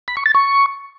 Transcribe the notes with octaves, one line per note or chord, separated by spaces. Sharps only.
B5
C#6
A6
C#6